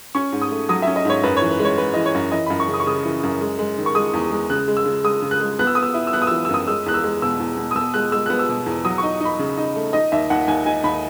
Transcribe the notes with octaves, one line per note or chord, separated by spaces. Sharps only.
C#4 C#6
G#2
D#6
A3
F#3 D#6
C#4 E5
D#5
G#2 C#5
F#2 B4
C#5
E3
B4
G#3
C#5
G#3 B4
E3 D#5
C#5
F#2
E3 D#5
F#2 B5
C#6
C#3
D#6
C#6
C#3 D#6
E3
F#2
G#3
G#3
D#3
C#6
G#3 D#6
E2
G#3
C#3 F#6
G#3
E6
C#3
G#3 D#6
C#3
F#6
G#3
B3 F#6
E6
B3 D#6
E6
E4
E6
B3 F#6
D#6
E3 E6
E6
F#2 D#6
G#3 E6
E2 F#6
E6
G#3
B2 E6
E2
B2
D#6
B2 E6
G#3 F#6
G#3 E6
B3 F#6
E6
B2
E2
F#3 D#6
D#4 C#6
D#4 B5
C#3
D#4
A3
D#4 D#5
D#2 E5
D#2 F#5
D#2 G#5
D#4 G#5
D#2 B5